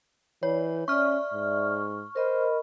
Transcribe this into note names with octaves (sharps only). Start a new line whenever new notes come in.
E3 C#5 D5
C#4 D5 E5 C#6 F6
G#2
A#4 C5 D#5 B5